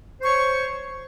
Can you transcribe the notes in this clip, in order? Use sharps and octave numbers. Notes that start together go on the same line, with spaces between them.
C5 C#5 C#6